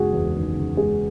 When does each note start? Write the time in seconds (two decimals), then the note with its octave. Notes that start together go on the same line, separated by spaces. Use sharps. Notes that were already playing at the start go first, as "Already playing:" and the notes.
Already playing: F#1 G#3 F#4 G#4
0.13 E2
0.35 D#3
0.56 F#1
0.77 G#3 G#4